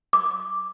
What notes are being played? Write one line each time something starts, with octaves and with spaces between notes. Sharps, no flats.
D6